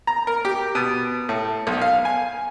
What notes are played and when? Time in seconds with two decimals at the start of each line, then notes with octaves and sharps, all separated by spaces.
0.07 A#5
0.27 A#4
0.45 G4
0.75 B2
1.29 A2
1.67 B1
1.82 F5
2.05 G#5